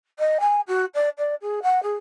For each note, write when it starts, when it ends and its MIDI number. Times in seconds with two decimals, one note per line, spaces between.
0.19 0.38 75
0.40 0.60 80
0.67 0.85 66
0.94 1.09 74
1.17 1.34 74
1.41 1.59 68
1.62 1.82 78
1.82 1.94 68